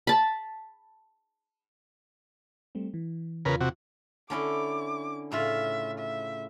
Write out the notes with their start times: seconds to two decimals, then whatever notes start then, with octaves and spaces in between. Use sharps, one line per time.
0.07 A5 B5
2.75 G3 A3 C4
2.94 E3
3.45 E2 C#3 F4 A#4 B4
3.61 C3 F#4
4.30 D3 C#4 E4 D6
5.32 A2 C#3 F4 E5
5.98 E5